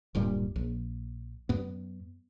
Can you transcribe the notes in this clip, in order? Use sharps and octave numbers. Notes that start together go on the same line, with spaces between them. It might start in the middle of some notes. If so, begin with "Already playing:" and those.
D1 G2 A#2 G3
A#1
F#2 B3